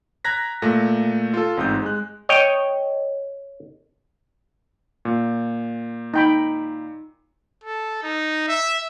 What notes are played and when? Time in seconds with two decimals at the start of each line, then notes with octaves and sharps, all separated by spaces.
0.24 A#5 F#6 G#6 A#6 B6
0.62 A#2 A3 A#6
1.34 F4 A4
1.57 A1 G#2 C4 D#4 D#6 G6
1.82 G#3 F#6
2.29 C#5 D#5 G5
5.05 A#2
6.14 D#4 G5 B5
7.64 A4
8.03 D#4
8.48 E5